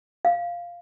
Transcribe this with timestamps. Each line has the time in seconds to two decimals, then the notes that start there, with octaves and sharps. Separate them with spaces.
0.25 F5